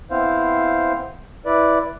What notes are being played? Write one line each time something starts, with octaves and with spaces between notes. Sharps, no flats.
B3 C4 E4 C5 F5
E4 B4 D5